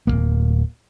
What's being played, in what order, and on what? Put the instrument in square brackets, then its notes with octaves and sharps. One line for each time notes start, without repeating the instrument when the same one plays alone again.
[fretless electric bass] D1 F2 A#3